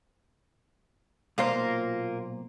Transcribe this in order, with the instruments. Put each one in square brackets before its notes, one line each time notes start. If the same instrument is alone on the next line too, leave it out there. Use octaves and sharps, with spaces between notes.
[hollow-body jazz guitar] B1 A#2 C5 [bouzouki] A#3 F4